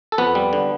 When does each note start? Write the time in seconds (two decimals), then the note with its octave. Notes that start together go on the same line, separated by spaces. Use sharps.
0.12 A4
0.18 F2 B3 B4
0.35 G3
0.53 D3